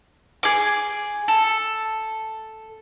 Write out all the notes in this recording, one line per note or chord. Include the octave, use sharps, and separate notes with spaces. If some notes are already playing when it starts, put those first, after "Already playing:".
G#4 D6
A4